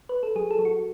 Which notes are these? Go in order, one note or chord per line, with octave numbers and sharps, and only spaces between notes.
B4
A4
F#3 G#4
A4
F#3
F#4